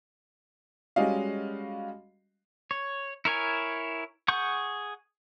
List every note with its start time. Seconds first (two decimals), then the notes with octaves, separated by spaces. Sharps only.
0.96 G3 G#3 C#4 F#4 D#5 F5
2.71 C#5
3.25 E4 A#4 C#5 G#5
4.28 G#4 F#5 C#6 G6